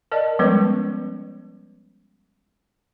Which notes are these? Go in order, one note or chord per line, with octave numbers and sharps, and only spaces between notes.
A#4 D5 D#5 A5
F3 G3 G#3 B3 C#4 B4